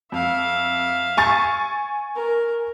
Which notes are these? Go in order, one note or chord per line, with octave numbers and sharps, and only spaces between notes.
F2 E5 F5
G#5 C#6 A6
A#4